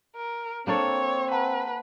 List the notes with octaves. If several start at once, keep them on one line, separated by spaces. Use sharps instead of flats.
A#4
A#3 C4 D4 A4 C#5
B4 F#5 A5 A#5